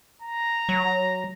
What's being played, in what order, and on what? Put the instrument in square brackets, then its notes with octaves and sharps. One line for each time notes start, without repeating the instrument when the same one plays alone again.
[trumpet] A#5
[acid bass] F#3